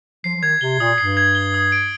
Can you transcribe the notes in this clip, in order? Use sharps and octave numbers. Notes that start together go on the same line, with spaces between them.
F3 C7
F3
D#3 G#6
C3 G7
A#2 D#6
G2 C7
G#6
G7
D#6
D7